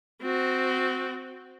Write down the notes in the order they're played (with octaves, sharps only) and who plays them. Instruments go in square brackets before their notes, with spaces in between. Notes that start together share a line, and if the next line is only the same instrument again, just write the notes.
[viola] C4 F#4